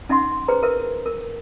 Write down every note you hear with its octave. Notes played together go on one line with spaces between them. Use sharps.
C#4 D#4 E5 F#5 C6
G#4 B4 C5 A#5
A#4 B4 E5
A#4